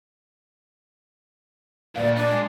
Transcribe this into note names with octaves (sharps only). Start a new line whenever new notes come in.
D2 G2 A#2 D5 F5
D4 D#4 G#5
G#3